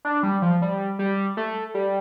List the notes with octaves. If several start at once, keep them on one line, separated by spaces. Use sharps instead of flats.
D4
G3
F3
G3
G3
A3
G3